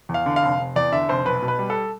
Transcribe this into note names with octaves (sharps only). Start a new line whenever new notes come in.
E2
F5
D3
F5
F1
F1
E2 D5
D3 E5
F1 C5
B1 B4
B2
B4
G3
A4